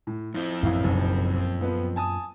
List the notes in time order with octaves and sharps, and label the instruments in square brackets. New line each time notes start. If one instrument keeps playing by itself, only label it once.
[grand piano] A2
[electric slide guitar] F2 C4 [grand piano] E4
[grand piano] A1 E4 F5 [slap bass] F#2 A#2
[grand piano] F#1 B1
F3 B3 B4
G#5 A5 D#6